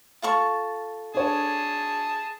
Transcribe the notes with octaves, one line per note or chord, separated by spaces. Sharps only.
F4 A4 C#6
D4 G#4 C#5 A5